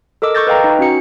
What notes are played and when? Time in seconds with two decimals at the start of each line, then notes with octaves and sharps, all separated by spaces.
0.22 A4 A#4 D#5 D6 E6
0.35 C#6 D6 E6 G6 A6 A#6
0.47 B4 D#5 F5 G5 A#5
0.64 D#4
0.79 C#4 F#4 C#7